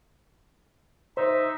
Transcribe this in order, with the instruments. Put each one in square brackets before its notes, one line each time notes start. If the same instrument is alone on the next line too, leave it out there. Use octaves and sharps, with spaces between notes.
[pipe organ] D#4 E5 [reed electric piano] C5